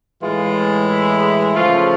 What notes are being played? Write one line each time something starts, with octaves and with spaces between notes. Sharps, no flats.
A2 E3 G#3 F4
E4
C#3 F3 A3 F4